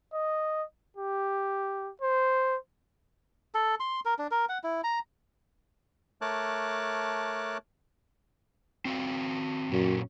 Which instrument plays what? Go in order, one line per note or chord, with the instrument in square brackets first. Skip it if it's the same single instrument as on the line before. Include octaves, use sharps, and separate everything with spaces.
[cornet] D#5
G4
C5
[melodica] A4
C6
A#4
D4
A#4
F#5
E4
A#5
[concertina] A3 A#4 C#5 A5 D6 F#6
[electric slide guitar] C4 F#4 F5
[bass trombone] F#2 [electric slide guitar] A#2 C#4